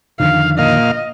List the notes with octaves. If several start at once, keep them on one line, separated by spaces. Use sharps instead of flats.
F2 D3 D#3 F5
A#2 D#5 F5